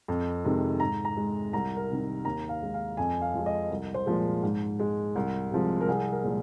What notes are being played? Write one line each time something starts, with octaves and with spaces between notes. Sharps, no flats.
F2
C3 D#3 G#3
G#2 A#5
A#5
G#3
C2 A#5
A#4
C3 D#3
D#2 A#5
F5
D#3 G#3
F5
F2 G#5
F5
F3 G#3
D#5
C2
C5
A#2 F3 G#3
G#2
G#3
C2
C3 F3 G#3
A#4
C2 G#4
A#4
A#2 F3 G#3